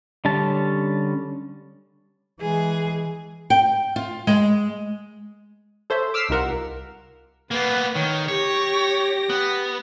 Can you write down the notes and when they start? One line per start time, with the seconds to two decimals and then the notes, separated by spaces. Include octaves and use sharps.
0.25 D3 G3 C#4 A5
2.41 E3 G#3 G#4
3.50 G5
3.96 F4
4.27 G#3
5.90 A4 C5 C#5 E5
6.14 D6 E6 F6 B6 C7 E7
6.29 C2 D#4 F4 A#4 F#5
7.51 A#3 B3 B4
7.95 D#3 C#5
8.28 G4 C#5 A#6
9.30 B3